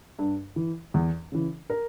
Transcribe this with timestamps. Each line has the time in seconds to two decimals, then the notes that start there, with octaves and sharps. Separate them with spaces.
0.19 G2
0.56 E3
0.94 E2
1.32 C#3 E3
1.70 A#4